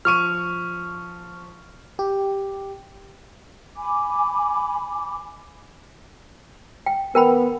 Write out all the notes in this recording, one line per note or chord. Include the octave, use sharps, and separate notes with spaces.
F3 C#6 F6 D#7
G4
G#5 B5 D6
G5
B3 A#4 G5 B5